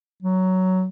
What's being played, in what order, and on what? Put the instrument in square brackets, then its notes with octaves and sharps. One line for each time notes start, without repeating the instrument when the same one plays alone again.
[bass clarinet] F#3